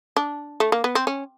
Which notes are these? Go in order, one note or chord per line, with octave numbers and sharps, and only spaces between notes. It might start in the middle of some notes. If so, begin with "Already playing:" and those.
D4
A3
A#3
B3
C4
C#4